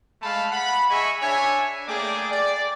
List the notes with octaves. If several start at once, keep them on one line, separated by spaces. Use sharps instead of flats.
G#3 A3 F5 A5 B5
F#5 B5
G#4 D#5 E5 G#5 B5 C#6
D4 C#5 E5 G#5
A3 A#3 G#4 D5 G5 D6
D5